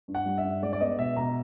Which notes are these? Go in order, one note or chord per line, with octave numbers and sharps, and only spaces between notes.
G2
F#5
G3
E5
G2
G#3 D5
D5
B3 D#5
B2 E5
B2 A#5